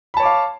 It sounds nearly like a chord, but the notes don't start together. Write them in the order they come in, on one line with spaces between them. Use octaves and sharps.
B5 A5 C#5 D6 F5